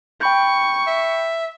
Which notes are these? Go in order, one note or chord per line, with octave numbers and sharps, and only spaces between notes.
G5 B5 C#6 G6
E5